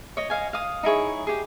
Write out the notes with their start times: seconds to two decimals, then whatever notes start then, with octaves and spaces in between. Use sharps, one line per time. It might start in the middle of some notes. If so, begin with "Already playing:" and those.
0.17 C#5 D#5
0.30 D#5 F5 G#5
0.53 F5 D#6
0.83 D#4 E4 G#4 C#5
1.27 G4 G#4